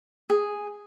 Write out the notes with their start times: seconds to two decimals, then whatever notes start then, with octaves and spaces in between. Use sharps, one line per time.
0.30 G#4